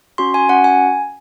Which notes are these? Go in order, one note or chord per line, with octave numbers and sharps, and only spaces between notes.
C#4 F#4 C6
G#5
C#4 F#4 F#5
G#5